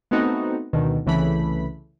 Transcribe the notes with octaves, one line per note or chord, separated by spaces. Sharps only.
A3 B3 C4 D#4 F#4
D2 B2 D3 D#3
C2 C#3 E3 A3 B5